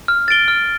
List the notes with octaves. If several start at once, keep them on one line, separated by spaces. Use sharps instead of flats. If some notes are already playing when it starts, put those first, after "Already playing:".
F6
A6 D7 G7
F6